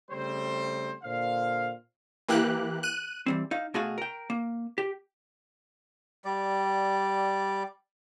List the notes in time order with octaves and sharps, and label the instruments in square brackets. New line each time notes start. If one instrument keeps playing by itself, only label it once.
[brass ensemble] C#3 G3 A3 C4 C5
A#2 D3 C5 F5
[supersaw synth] E3 A#3 G4 F#6
F#6 D#7
[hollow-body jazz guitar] E3 G3 C4
D#4 F5
B2 A3 F#4 G#4 F5
A#4 G5
A#3
G4
[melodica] G3 D5